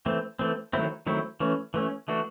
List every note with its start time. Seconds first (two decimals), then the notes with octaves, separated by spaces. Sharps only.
0.06 E3 A3 C4
0.39 E3 A3 C4
0.73 D#3 F#3 A3 C4 E4
1.06 D#3 F#3 A3 C4 E4
1.40 E3 A3 C#4
1.74 E3 A3 C#4
2.08 E3 A3 D4 F#4